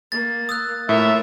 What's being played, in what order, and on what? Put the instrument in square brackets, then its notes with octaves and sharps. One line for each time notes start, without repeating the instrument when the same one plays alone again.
[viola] A#3 [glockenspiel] A6
[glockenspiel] D#6 E6 F#6
[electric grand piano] A2 [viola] F4 A#4 [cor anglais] E5